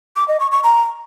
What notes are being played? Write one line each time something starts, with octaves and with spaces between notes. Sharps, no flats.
D6
D#5
C#6
C#6
A#5